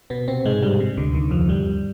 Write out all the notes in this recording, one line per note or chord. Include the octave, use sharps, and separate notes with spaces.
B2 B3
C3 C4
G#2 G#3
G2 G3
C3
D2 D3
D#2 D#3
F2 F3
G2 G3